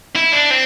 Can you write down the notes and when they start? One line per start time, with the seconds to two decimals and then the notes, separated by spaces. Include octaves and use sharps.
0.16 E4
0.32 D4
0.51 C4